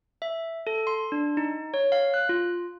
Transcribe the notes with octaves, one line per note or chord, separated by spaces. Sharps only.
E5
A4
C6
D4
D#4
C#5
F5
F#6
F4